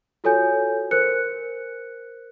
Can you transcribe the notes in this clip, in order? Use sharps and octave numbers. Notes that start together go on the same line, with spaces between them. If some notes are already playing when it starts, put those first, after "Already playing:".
F4 F#4 A4 C#5 G#5 G6
A#4 C5 F#6 C#7